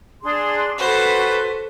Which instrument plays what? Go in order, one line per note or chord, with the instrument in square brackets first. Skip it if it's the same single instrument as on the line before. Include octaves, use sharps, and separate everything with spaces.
[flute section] D4 G#4 C6
[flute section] F#4 B4 [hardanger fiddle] A4 C5